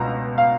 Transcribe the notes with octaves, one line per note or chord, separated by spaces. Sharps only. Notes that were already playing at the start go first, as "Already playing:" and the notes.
Already playing: C#2 B2 A#5
F5